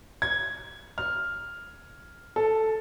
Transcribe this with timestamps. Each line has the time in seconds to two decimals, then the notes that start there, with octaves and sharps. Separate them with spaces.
0.22 G#6
0.98 F6
2.36 A4